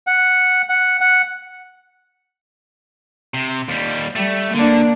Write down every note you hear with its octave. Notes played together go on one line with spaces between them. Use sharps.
F#5
F#5
F#5
C3
D#2 G3
G3 A3
D3 A#3 D4